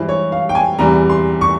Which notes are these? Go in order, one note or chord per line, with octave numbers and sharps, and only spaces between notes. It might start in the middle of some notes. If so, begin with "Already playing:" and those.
Already playing: G2 E3 G#3 E4 C5
C#5
F5
G5
G#5
E2 C3 E3 G3 A#5
C6
C#6